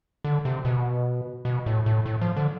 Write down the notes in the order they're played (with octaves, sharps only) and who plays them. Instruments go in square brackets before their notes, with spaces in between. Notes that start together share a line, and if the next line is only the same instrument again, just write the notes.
[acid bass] D3
C3
B2
B2
A2
A2
A2
F3
D3